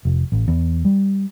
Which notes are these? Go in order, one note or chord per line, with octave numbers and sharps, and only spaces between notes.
F1
A1
E2
G3